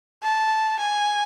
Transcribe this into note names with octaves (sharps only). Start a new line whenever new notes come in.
A5
G#5